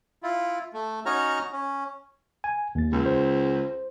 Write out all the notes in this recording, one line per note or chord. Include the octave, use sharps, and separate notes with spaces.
E4 F4
A3
C#4 D#4 F#4 C#5 A#5 F6
C#4
G#5
D#2 A6
C#2
C5